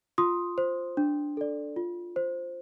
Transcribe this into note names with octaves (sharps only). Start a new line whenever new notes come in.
F4 C6 D#6
C5
D4
A4 D5
F4
C5